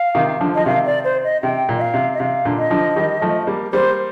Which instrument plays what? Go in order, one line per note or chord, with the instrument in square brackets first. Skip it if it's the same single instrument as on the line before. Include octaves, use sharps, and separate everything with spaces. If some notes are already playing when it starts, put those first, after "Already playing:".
Already playing: [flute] F5
[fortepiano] C3 D#3
D3 F3
[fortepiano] F3 [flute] D#5
[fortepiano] C3 D#3 [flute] F5
[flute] D5
C5
D#5
[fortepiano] C3 [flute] G5
[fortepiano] A#2
[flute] D#5
F5
[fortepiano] C3
[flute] D#5
[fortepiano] C3 [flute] F5
[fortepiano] A#2 D3
[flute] D#5
[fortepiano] D3 F3
D#3 G3
F3 A3
G3 A#3
[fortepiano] G3 A#3 [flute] C5